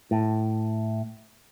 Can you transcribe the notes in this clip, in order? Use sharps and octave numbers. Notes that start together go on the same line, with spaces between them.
A2